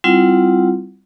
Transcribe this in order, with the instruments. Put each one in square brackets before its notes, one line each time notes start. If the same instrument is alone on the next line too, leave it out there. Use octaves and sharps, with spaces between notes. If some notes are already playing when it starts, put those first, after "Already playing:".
[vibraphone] G3 C4 E4 F4 F#5